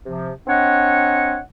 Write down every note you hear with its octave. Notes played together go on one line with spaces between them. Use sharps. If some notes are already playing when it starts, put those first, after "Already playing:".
C3 F3
C4 D4 C#5 D#5 F#5